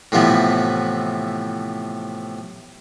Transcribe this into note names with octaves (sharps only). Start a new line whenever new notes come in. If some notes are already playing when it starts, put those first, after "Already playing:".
A2 C3 E3 F3 B3 E4